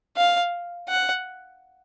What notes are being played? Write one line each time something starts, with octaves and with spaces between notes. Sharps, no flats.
F5
F#5